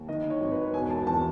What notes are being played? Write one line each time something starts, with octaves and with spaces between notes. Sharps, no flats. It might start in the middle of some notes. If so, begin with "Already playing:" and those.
Already playing: D#2
D#3 D#5
C#5
G#1
B4
E1 G#5
A5
E2 A5